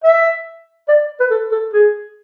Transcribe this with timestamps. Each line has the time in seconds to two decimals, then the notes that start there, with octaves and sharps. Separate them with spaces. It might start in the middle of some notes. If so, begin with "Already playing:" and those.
0.04 E5
0.88 D5
1.20 B4
1.30 A4
1.51 A4
1.73 G#4